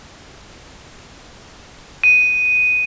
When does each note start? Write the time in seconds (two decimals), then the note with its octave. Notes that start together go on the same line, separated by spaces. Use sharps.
2.04 D#7